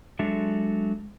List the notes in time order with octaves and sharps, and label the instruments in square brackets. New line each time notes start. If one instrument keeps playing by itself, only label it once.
[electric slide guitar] F#3 G#3 D4 A4 E5